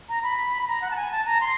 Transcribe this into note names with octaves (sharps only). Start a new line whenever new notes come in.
A#5
B5
B5
A#5
F#5
A5
G#5
A5
A#5
C6